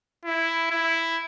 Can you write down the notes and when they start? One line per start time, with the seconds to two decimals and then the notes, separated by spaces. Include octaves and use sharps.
0.25 E4
0.71 E4